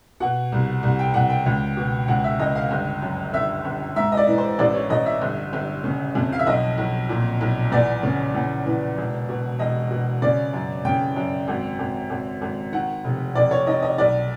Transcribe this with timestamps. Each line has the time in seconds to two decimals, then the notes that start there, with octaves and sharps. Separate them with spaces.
0.20 B2 F#5
0.52 C2
0.83 C2
0.99 G5
1.14 C2 F#5
1.30 G5
1.46 C#2
1.77 B2
2.08 C#2 F#5
2.24 E5
2.39 C#2 D#5
2.55 F5
2.71 G1
3.02 F#2
3.33 G1 E5
3.65 G1
3.96 G#2 E5
4.12 D#5
4.17 D5
4.27 E3
4.38 C5
4.59 A1 D5
4.74 C#5
4.90 A1 D#5
5.06 E5
5.21 G1
5.53 G1
5.84 C#3
6.15 F2
6.33 F5
6.39 E5
6.47 B1 D#5
6.78 B1
7.09 A#2
7.41 B1
7.72 E2 D5
8.03 C#3
8.35 E2
8.66 E3
8.98 E1
9.29 B2
9.59 E1 D#5
9.91 B2
10.22 C#3 D5
10.53 F#2
10.85 C#3 G5
11.16 F#2
11.48 G#1
11.79 G#1
12.10 G#1
12.42 G#1
12.72 D#3 F#5
13.04 F1
13.35 F1 D5
13.51 C#5
13.67 D#3 D#5
13.82 D#5
13.98 B1 D5